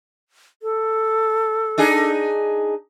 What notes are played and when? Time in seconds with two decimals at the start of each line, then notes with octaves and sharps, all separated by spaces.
0.62 A4
1.78 D4 D#4 G#4